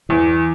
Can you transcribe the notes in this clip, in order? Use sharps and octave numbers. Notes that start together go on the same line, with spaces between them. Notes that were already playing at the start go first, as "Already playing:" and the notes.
E2 E3